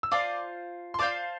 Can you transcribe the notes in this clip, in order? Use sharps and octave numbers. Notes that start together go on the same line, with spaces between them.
E6
F4 C5 D5 F5 A5 D6
C6
F4 C5 D5 F5 A5 D6